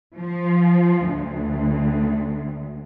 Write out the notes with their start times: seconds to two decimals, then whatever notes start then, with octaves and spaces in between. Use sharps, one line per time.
0.18 F3
1.08 D2